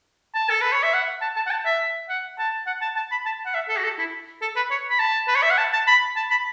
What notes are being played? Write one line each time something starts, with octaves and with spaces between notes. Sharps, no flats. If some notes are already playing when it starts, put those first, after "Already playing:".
A5
A4
B4
C#5
E5
F#5
A5
A5
F#5
A5
E5
F#5
A5
F#5
A5
A5
B5
A5
F#5
E5
A4
F#4
A4
E4
A4
B4
C#5
B5
A5
B4
C#5
E5
F#5
A5
A5
B5
A5
B5